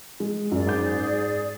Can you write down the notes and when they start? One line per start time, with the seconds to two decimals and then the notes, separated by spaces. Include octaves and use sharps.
0.20 G#3
0.52 F#2 G#4 D5
0.66 G#2 D6 G6